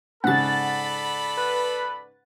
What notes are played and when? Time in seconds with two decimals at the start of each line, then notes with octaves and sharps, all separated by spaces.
0.24 G#2 C#3 A4 D5 F#5 B5 A6
1.37 B4